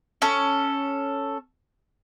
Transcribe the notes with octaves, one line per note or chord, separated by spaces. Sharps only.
C#4 A4